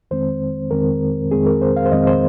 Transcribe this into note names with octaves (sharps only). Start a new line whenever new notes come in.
F2 D#3 G#3 C4 C5
F2 D#3 G#3 C4 A#4
F2 D#3 G#3 C4 G#4
A#4
C5
F5
C5
F2 D#3 G#3 C4 D#5
C5